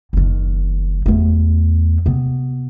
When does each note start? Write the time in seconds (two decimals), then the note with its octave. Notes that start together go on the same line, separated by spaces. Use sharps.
0.13 F#1 D#3
1.06 E2 A3
2.06 C3 B3